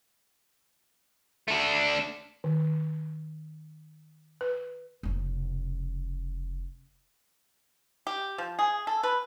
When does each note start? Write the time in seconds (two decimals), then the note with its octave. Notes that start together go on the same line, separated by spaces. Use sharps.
1.48 A3 D4
2.44 D#3
4.41 B4
5.03 F1 C#3
8.07 G4
8.38 F3
8.59 G#4
8.87 A4
9.03 B4